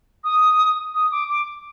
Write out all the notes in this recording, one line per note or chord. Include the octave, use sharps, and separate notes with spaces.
D#6
D#6
D6
D6